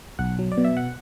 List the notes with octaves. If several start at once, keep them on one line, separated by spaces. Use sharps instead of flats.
B1 F#5
F#3
D5
B2
E5
F#5